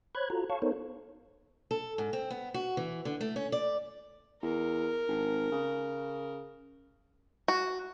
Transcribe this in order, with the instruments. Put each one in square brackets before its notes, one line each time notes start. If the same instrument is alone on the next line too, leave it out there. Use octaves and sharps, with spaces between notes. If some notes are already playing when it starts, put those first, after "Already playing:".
[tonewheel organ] C5 C#5 B5 F#6 G#6
F4 F#4 A4 A#5
C#5 F5 A5 C#6
B3 D#4 A4 A#4 C5 C#5
[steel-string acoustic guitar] A4
G#2
C4
B3
F#4
E3
D3
A3
C#4
D5
[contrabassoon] E2 [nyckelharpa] A#4
[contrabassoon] G#1
C#3
[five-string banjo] F#4